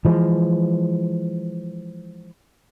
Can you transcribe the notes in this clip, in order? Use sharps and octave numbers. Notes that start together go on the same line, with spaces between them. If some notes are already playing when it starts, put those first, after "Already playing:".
E3 F3 G#3